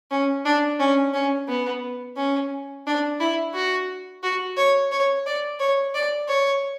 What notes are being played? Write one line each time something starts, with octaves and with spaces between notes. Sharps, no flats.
C#4
D4
C#4
C#4
B3
C#4
D4
E4
F#4
F#4
C#5
C#5
D5
C#5
D5
C#5